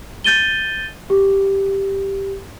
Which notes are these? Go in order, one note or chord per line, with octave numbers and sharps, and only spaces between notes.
G6 A6 D#7 G7
G4